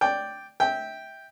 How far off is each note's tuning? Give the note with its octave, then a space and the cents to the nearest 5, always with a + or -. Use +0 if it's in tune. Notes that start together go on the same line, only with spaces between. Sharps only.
D5 +0 G5 +0
E5 -20 G5 +0